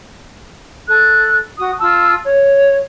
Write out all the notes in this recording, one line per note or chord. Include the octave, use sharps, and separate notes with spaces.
A4 F#6
F#4 D#6
F4 A5 E6
C#5